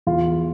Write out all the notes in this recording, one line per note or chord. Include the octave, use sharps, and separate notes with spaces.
E2 F4